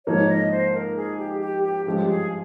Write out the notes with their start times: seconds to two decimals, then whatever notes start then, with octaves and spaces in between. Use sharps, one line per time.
0.06 G#2 F3 A#3 D#4 A#4 C#5
0.29 D#5
0.51 C5
0.74 A#4
0.96 G#4
1.18 G4
1.41 G4
1.63 G4
1.86 G2 F3 G#3 C#4 G4
2.09 G#4